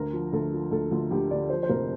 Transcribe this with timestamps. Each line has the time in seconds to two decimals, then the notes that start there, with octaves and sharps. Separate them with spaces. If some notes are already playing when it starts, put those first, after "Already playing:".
Already playing: D2 A#4
0.13 F3
0.33 D2 A4
0.53 F3
0.71 D2 A4
0.91 D2 F4
1.11 D2 G4
1.31 D3 D5
1.50 F3 C5
1.63 C5
1.69 F1 A#4